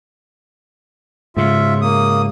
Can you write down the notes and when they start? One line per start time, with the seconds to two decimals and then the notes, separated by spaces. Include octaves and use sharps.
1.37 G#2 C#3 F4 E5
1.81 A#3 D#6